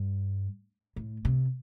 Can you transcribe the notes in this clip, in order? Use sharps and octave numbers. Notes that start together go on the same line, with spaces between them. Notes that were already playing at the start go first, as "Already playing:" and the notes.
Already playing: G2
A2
C3